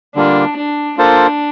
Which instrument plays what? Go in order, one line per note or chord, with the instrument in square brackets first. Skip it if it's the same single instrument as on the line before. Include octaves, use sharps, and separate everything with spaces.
[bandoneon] D3 G3 A#3 F4 [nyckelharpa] D4
[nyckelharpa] D4
[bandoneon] A#3 F4 A4 C5 [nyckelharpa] D4